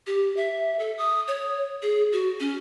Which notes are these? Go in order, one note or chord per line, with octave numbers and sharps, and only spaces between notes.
G4
E5
A4
D#6
C#5
G#4
F#4
C#4